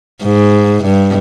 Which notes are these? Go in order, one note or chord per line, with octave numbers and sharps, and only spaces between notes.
G#2
G2